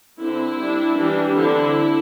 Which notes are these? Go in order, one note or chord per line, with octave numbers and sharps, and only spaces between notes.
D3 C4 E4
G3 D4
E3 G3 D4
D3 C4 E4